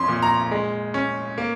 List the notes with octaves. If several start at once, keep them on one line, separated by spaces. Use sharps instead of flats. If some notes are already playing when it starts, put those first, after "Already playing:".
Already playing: F2 C#4 C6
A#2
A#5
G#3
C#4
A#3